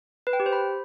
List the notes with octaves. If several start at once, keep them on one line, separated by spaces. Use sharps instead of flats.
B4
G5
G4
C5
B5